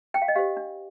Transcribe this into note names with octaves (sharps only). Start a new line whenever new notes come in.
D4 G5
F5
D#5
G4 C5 F5
D4